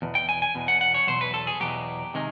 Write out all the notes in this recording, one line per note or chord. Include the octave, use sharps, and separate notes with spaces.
E2 B2
G5
G#5
G#5
E2 B2
F#5
F#5
C#5
E2 B2 F#3 C5
B4
A4
G#4
E2 B2 F#3 G4
C3 D#3 G#3